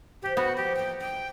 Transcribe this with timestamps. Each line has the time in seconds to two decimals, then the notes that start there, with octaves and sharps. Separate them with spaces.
0.22 C3 E3 G4
0.37 D#2 A2 B3 F#4
0.57 F3 G4
0.76 E3 A#3 G5
1.00 D2 D#4 G5